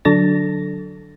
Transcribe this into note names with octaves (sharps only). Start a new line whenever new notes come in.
D3 F#3 D4 A4 A6 A#6